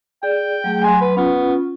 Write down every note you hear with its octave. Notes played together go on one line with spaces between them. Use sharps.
G#4 D5 G5
F#3 A3 G#4
F#3 G#5 C6
B4
B3 C#4 F4